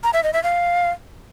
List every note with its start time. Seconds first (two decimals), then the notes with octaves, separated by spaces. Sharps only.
0.04 A#5
0.13 E5
0.23 D#5
0.33 E5
0.43 F5